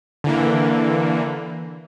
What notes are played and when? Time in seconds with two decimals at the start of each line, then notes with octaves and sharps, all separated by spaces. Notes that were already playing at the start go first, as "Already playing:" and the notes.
0.24 D3 E3 A#3